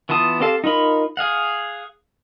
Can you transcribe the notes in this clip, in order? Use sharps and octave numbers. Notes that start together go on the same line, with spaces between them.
E3 B3 F4 A5 D#6
C4 G4 A4 F5 A5
D#4 F4 A#4 B5
G#4 F5 F#5